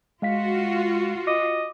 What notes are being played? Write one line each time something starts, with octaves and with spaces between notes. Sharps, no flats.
G#3 F4 F#4 F5 B6
D#5 D6